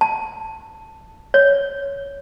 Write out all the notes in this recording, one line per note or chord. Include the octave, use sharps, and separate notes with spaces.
A5
C#5